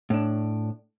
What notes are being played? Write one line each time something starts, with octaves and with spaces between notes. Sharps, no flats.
A2 D4